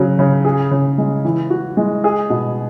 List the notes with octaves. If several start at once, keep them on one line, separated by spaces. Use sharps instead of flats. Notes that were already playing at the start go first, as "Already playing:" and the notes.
Already playing: C#3 F#3
C#3
G#4
C#3
G#3
E3
F#4
G#3
G#4
B2